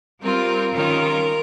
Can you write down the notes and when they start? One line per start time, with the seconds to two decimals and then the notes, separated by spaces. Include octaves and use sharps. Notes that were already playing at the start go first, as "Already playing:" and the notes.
0.20 G3 C4 F4 A#4
0.73 D#3 G3 C#4 F4 A#4